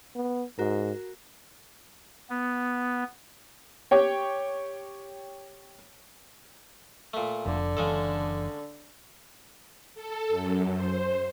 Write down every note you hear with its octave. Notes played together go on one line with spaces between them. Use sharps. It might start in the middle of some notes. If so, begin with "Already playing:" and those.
B3
G#2 F#4 A#4
B3
G4 C#5 G5
A#2 A3
F1 F2 D3
F#1 C#3 E3 G#3 D4 A4
A4
F#2
C5